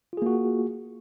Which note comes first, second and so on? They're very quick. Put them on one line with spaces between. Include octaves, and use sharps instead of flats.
F4 G#4 A#3 F#4